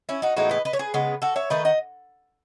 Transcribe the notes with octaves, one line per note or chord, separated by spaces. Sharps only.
C#4 E4
D#4 F#4
A2 E3 G#3 B3 D#4 F#4
B4 D#5
B4 D#5
C#5
G#4 B4
C#3 G#3 B3
F#4 A4
C#5 E5
D#3 A3 B4 D#5
D#5 F#5